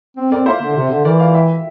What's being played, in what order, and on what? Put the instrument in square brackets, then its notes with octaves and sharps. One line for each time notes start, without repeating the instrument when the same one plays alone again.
[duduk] C4
[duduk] C4 [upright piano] A#4 D5
[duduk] A#3 [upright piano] C5 E5
[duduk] D3
C3
D3
[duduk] E3 [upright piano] A#4 D5
[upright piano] D5 F5
E5 G5